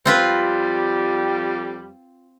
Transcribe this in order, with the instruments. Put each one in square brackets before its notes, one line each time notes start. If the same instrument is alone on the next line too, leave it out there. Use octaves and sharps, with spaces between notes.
[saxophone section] F2 G3 [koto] C4 F4 B4